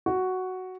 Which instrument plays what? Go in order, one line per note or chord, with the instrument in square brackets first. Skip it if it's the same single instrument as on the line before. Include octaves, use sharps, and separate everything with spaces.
[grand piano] F#4